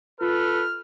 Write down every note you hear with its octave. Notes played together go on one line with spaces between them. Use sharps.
F4 A4 B4 F6